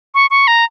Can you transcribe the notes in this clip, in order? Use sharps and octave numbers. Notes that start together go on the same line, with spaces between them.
C#6
C#6
A#5